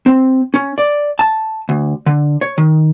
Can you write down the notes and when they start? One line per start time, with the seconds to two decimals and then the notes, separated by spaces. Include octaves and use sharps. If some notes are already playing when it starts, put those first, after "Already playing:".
0.06 C4
0.54 C#4
0.78 D5
1.19 A5
1.69 D2
2.06 D3
2.41 C#5
2.58 D#3